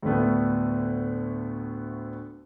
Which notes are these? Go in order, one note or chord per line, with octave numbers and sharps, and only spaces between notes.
D2 A2 D3 A3 B3